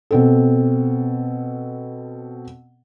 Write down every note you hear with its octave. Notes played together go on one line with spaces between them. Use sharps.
B2 C4 A4